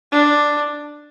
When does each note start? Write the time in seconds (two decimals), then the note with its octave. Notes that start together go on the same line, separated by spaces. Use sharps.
0.12 D4